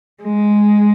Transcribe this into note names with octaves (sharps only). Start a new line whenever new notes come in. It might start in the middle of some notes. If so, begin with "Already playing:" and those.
G#3